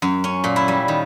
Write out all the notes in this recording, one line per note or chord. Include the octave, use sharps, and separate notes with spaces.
F#2
C#4
A#2
E4
G3
D#3